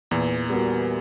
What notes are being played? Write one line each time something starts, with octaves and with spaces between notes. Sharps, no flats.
E2 A#2 E3
G3 B3 F#4 A#4